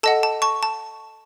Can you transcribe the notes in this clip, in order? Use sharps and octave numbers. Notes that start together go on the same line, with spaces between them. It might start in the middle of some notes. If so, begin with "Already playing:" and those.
A4 D#5 F#5 A5
A5
A5 C#6
A5